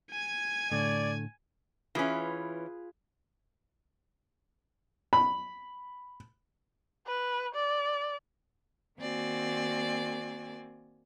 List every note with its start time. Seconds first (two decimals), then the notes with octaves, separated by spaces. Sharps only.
0.11 G#5 G#6
0.72 A2 D3 A3 D5
1.95 E3 C#4 F4 G#4 B4
5.13 B5
7.07 B4
7.55 D5
8.99 D#3 A#3 C4 F#4 D5 G#5